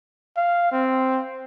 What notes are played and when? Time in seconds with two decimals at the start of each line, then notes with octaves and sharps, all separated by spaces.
0.37 F5
0.72 C4